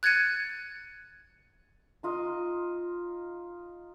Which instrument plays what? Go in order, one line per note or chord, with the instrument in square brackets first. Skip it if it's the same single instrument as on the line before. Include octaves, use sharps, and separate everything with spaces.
[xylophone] F#6 G#6 A6 C#7 D#7
[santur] D#4 F4 D#5